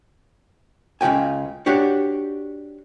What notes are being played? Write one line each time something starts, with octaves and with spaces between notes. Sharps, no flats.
C#2 C#3 D#4 G5 G#5
D4 F#4 G4 C#5